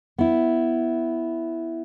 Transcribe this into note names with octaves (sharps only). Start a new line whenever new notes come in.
B3 E4